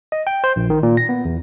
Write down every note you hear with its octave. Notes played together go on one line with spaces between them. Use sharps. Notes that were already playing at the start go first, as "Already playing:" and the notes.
D#5
G5
C5
A#1
D#3
A#2
A#6
B3
E2